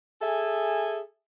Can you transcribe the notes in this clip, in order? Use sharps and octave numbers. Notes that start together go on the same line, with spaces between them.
G#4 A4 E5 G#5